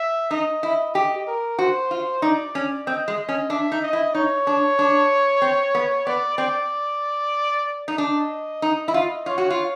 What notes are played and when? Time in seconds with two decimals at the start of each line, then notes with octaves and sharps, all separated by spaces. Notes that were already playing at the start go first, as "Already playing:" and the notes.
Already playing: E5
0.31 D#4 D#5
0.63 E4
0.94 G4 D#5
1.27 A#4
1.58 F#4 C5
1.91 F4
2.22 D#4 D5
2.55 C#4
2.86 C4 D#5
3.08 G#3
3.19 D#5
3.29 C#4
3.50 D4 E5
3.72 D#4
3.82 D#5
3.93 E4
4.14 D#4 C#5
4.47 D4
4.79 D4
5.42 C4
5.75 B3
6.06 B3 D5
6.38 C4 D5
7.88 D#4
7.98 D4 D#5
8.62 D#4
8.88 E4
8.94 F4
9.26 F4 C#5
9.38 F#4
9.50 F4